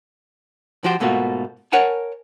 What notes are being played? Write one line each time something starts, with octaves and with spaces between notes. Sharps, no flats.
F3 F#4 G4 C5
G#2 B2 A3 A#3 F4 F#4
A#4 C#5 F#5 G#5 A5